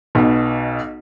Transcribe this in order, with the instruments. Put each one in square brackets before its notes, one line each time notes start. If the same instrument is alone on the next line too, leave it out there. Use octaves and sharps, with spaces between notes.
[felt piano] B1 B2